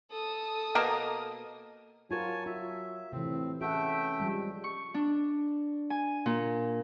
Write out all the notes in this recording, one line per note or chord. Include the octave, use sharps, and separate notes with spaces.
A4 D#6
B2 A#3 A#4
F#3 F4 F#4 A#4 C#5 G#5 A5
F4 E5
A2 C3 E3 C4
A3 C#4 F#4 G#4 E5 F#5 G5
F3 G3 G#3
C#6
D4
G#5
A#2